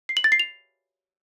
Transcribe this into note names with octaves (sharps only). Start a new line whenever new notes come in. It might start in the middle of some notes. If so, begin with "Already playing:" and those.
C7
F#7
A6
C7
F7